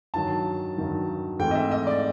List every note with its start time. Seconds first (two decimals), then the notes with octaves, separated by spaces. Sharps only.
0.14 G2 D#3 F#3 A5
0.77 G2 D#3 F#3
1.39 G#2 E3 A3 C4 G5
1.51 D#5
1.55 E5
1.71 D#5
1.87 D5